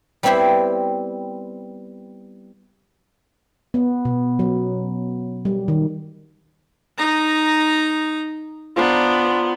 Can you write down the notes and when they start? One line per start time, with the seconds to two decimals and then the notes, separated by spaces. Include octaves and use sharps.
0.23 G3 B3 C4 E4 G4 C5
3.74 B3
4.05 B2
4.39 F#3
5.45 G3
5.68 D#3
6.98 D#4 A#5
8.76 B3 D4 F4 C5 A#5